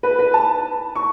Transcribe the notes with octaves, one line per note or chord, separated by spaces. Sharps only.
B4
B4
A5
C#6